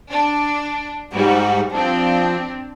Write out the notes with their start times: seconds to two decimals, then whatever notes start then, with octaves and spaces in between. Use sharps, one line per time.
0.10 D4
1.13 G#2 G3 F#4
1.72 F3 C4 D4